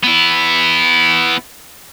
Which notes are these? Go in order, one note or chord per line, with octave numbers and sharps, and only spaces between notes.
B3 E4